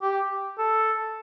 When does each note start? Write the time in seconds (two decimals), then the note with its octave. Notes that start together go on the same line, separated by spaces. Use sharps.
0.02 G4
0.59 A4